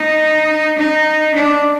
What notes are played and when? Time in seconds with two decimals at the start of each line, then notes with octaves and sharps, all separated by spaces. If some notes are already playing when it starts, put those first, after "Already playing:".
Already playing: D#4
0.78 D#4
1.34 D4